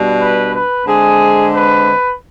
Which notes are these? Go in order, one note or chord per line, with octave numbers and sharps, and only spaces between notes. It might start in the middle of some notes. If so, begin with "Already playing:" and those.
Already playing: B2 G3 D4
B4
B4
D3 G#3 C4 G#4
B4